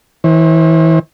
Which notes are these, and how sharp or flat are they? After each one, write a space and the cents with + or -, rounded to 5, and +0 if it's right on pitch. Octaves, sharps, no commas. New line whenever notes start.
E3 -25 C5 +45